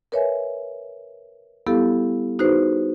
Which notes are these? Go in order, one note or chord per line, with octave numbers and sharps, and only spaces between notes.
A#4 B4 C#5 D#5 E5 G#5
G3 B3 E4 G4 A4 F5
D#4 F#4 G#4 B4 C5